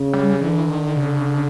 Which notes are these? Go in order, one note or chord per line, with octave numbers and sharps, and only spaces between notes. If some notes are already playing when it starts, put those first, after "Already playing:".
Already playing: C#3
G3
D3 E3
D#3
C#3